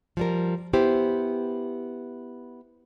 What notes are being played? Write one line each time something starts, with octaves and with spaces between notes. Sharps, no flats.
F3 G3 A#4
B3 E4 G4 C5